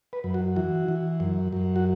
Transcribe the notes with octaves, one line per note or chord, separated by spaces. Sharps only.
B4
F#2
F#4
E3 F#4
E3
F#2
F#2
F#4